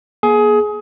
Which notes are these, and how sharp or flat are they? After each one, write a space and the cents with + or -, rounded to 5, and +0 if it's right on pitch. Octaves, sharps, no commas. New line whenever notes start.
A#3 +40 G#4 +20